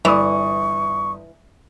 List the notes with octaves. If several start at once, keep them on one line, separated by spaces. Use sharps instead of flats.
G1 E3 D5 C#6 D#6